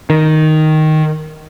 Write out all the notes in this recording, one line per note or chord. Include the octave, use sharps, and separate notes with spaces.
D#3